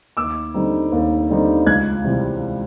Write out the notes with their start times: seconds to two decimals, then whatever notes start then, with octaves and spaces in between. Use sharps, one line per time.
0.17 D#2 D6 E6
0.54 D3 G3 C4 D#4
0.92 D#2
1.30 D3 G3 C4 D#4
1.67 C#2 F#6 G#6
2.04 C3 E3 G3